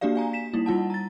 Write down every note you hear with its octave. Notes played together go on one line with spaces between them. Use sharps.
A#3 D4 F#4 G4 D5 F5
F5 G#5 A#5
B6 E7
G3 A#3 D#4 E4
G3 F4 F#5 A5
A#5 A6